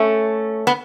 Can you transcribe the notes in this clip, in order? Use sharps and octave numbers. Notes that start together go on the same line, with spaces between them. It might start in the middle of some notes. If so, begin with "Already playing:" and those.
Already playing: A3 C#4
B3